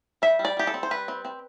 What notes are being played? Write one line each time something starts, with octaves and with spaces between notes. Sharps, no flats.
G3 E5
G3
D5
G3 G4
A4
C4
C5
G3 B4
C4
C4